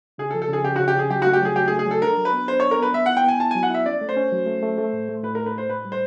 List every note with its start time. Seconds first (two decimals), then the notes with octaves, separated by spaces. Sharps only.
0.18 C#3 G#4
0.31 A4
0.35 F3
0.42 A4
0.49 C#3 G#4
0.64 C#3 G4
0.76 C#3 F#4
0.88 G4
0.95 C#3 G#4
1.10 F#3 G4
1.22 A3 F#4
1.33 G4
1.41 F#3 G#4
1.56 F#3 G4
1.68 G#4
1.72 A3
1.79 G#4
1.86 F#3 A4
2.02 D4 A#4
2.17 F#3
2.25 B4
2.33 B3
2.48 D4 C5
2.60 D4 C#5
2.71 A#4
2.79 B3 B4
2.94 B3 E5
3.06 E4 F#5
3.17 G5
3.24 B3 G#5
3.39 E4 A5
3.51 F#3 G#5
3.63 F#5
3.70 E4 E5
3.86 C#4 D5
4.01 A3
4.09 C5
4.17 C#4
4.32 F#3
4.46 A3
4.63 A3
4.78 A3
4.93 A2
5.09 A3
5.23 A2 B4
5.35 A2 A#4
5.46 B4
5.54 A2 C5
5.69 A2 B4
5.85 G3
5.92 C5